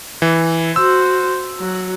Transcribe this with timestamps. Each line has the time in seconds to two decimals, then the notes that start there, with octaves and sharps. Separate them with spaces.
0.22 E3
0.76 F#4 C5 E6
1.59 F#3 F#4